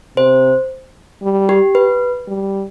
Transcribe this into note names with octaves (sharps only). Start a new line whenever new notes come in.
C3 C5
G3
G4
B4
G3